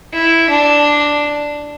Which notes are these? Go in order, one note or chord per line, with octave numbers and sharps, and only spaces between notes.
E4
D4